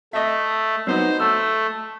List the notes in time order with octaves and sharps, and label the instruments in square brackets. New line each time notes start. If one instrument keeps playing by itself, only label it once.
[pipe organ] A3 [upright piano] D#5 E5
[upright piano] F#3 B3 D#4 [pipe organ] C5
[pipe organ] A3 [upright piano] E6